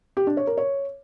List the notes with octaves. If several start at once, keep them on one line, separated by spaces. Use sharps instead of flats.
G4
D4
C#5
A#4
C#5